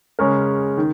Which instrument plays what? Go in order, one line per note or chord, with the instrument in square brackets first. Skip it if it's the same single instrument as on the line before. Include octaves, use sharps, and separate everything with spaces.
[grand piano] C#3 G#3 C#4 A#4
D#3